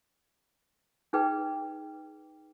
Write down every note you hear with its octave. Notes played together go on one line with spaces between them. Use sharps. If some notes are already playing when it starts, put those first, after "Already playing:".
D#4 G#4 B4 G5